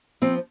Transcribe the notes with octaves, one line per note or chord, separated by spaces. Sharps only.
F3 C4